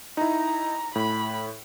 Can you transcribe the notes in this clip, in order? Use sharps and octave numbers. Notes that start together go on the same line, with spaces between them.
D#4 E4 A#5
A2 B5